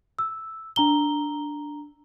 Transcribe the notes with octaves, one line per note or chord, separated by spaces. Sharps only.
E6
D4 A#5 G7